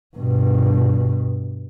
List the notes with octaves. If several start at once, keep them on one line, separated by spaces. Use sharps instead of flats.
G2 B2